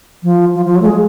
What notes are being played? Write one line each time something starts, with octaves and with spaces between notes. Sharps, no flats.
F3
F3
F3
F#3
A3
G#3